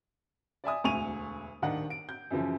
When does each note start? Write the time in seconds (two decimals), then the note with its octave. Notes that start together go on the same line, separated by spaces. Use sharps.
0.64 D5 E5 G#5 D#6
0.84 E1 D2 G#5 C#6 D#7 F7
1.62 D#1 D#3 D4 D#5 F#5
1.90 D7
2.09 G6
2.31 F#2 C#3 E3 F3